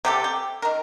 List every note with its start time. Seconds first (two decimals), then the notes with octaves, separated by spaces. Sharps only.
0.05 C3 G4 A4
0.24 G5
0.62 D#3 A#4